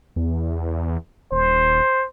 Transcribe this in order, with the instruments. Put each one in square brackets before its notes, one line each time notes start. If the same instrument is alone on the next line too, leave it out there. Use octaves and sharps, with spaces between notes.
[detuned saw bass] E2
[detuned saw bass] D#1 [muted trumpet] C5